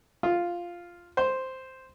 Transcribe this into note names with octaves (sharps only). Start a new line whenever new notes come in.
F4
C5